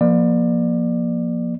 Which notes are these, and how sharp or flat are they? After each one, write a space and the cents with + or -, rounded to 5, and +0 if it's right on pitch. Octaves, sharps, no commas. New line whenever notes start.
F3 +0 A#3 +25 D5 +25